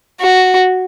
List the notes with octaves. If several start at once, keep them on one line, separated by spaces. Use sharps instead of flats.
F#4